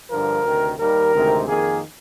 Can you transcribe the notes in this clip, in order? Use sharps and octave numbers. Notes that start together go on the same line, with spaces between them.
G2 D3 F3 A#4
D2 C3 D#3
D#2 D#3 G3 A#4
D2 C3 D#3 G#3 C4
F2 D#3 A#3 G#4